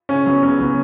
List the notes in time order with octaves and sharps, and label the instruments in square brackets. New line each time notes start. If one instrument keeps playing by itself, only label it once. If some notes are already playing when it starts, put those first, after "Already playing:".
[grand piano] C#3 [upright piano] C#4
[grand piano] F#3 B3
[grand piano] C#3 [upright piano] C#4
[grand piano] F#3 B3